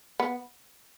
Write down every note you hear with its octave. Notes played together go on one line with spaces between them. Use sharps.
B3